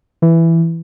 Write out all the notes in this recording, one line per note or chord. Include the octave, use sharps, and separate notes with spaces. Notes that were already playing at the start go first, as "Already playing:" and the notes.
E3